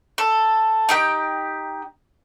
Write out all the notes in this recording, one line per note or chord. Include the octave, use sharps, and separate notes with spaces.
A4
D#4 G4 G5